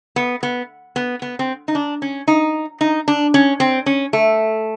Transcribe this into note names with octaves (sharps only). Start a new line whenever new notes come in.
B3
B3
B3
B3
C4
D#4
D4
C#4
D#4
D#4
D4
C#4
C4
C#4
A3